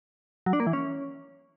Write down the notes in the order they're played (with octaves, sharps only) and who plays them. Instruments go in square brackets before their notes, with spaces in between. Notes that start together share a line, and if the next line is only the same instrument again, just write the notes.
[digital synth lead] F#3
D4
A#3
E3
C#4